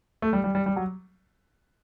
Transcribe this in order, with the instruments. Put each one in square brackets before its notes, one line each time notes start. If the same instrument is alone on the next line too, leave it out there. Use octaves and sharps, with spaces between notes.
[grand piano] A3
G3
G3
G3
G3
F#3